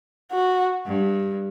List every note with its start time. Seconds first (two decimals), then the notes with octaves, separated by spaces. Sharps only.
0.32 F#4
0.86 G2